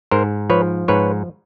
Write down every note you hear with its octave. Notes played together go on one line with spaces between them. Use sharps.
G#2 A#4 C5
F3 B4 C#5
G#2 B4 C#5